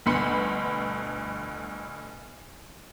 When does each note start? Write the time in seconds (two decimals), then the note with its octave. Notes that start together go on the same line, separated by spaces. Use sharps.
0.06 G1 D2 B2 B5 C6 C#7